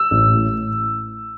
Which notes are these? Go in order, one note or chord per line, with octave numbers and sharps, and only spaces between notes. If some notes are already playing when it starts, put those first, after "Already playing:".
Already playing: E6
A1
A2